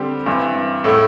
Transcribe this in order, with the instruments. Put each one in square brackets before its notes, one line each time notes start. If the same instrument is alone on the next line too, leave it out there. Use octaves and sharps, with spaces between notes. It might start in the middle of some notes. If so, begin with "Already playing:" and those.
Already playing: [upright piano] D3 G3 C4 G4
G2 E3 C4
A2 A3 E4